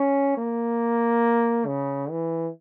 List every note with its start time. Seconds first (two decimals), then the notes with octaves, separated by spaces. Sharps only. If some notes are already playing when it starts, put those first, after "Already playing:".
Already playing: C#4
0.37 A#3
1.66 C#3
2.10 E3